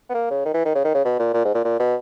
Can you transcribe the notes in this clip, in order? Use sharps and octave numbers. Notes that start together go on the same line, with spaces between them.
B3
A#3
C#3
D#3
E3
D#3
C#3
D#3
C#3
B2
A#2
A#2
G#2
A#2
A#2
B2